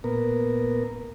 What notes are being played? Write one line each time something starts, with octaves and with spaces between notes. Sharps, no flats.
A#2 B3 A#4